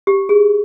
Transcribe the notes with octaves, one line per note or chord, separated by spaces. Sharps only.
G4
G#4